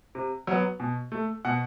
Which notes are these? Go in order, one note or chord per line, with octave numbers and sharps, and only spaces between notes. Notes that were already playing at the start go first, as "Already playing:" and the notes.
C3
F#3 B3
B2
A3
B2 F#5